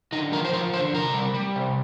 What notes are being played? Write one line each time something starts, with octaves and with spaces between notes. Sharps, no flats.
D3 D#4
F3 A#4
C5
F3 A#4
D3 C5
C3 A#4
G3
G3
C3